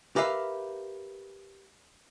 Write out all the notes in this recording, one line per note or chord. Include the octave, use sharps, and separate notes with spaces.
G4 A#4 B4 E5 F5